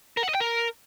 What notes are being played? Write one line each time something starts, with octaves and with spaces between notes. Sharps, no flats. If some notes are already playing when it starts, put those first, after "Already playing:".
A#4
F#5
D#5
G5
A#4